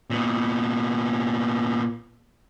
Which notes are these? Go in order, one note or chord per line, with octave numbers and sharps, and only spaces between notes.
A#2 B3